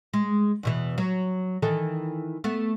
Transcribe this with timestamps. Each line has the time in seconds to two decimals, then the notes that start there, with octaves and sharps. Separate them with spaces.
0.13 G#3
0.63 E2 B2 E3
0.98 F#3
1.62 D#3 E3 A4
2.44 A3 B3